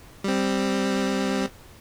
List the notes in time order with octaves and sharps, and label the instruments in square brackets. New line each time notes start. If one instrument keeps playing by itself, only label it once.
[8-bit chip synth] G3 C4